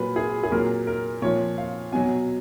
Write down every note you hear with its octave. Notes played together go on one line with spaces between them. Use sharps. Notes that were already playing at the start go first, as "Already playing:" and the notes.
Already playing: A#2 F#3 B4
G#4
G#4
A#2 F#3 A#4
A#4
A#2 F3 C#5
F5
B2 F#3 G#5